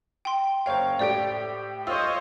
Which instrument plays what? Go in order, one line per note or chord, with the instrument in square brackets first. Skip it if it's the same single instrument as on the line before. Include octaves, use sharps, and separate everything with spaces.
[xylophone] G5 C6
[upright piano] F#1 C#5 F5 [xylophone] C5 G5
[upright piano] A2 G4 D7 [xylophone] D5
[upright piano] F4 [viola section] C5 C#5 D#5 [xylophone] E6